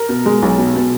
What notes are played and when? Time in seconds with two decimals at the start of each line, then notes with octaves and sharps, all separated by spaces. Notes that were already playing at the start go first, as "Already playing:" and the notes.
Already playing: A#4
0.09 B2
0.26 G#3
0.42 B1
0.58 B2
0.76 B2